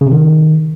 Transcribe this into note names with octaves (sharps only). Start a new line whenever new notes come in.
C#3
C3
D#3